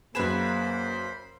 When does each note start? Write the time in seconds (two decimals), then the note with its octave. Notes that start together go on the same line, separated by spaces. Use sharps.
0.15 F#2 A#3 G#4 B4 C5 G#5 B5 E7